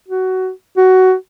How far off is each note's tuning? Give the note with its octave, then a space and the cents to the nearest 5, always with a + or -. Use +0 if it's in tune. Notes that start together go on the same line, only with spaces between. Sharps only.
F#4 +15
F#4 +15